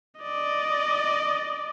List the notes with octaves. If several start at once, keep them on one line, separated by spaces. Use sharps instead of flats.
D5 D#5